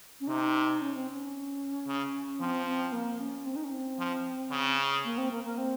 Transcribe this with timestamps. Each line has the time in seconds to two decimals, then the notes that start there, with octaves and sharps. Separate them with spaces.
0.20 C#4
0.28 C3 D#4
0.81 C#4
0.94 C4
1.08 C#4
1.87 C#3
2.40 F3 C4
2.66 C4
2.92 A#3
3.20 C#4
3.46 C4
3.56 D#4
3.64 C#4
3.72 C4
3.99 F3
4.51 C#3
5.04 A#3
5.18 C4
5.31 A#3
5.44 A#3
5.58 C4